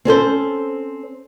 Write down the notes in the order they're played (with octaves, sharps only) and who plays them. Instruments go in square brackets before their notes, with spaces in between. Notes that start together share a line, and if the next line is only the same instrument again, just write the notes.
[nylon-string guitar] C4 C#4 A4 C5